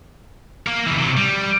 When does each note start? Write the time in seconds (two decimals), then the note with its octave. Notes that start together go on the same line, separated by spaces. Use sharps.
0.66 A#3 A#4
0.87 C#2 E3
0.98 C3 F#3
1.17 G3